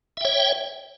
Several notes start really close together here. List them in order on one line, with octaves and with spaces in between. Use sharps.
E5 G5 C#5